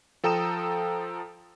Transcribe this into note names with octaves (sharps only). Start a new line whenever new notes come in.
F3 A4 G5 A#5 D#6 E7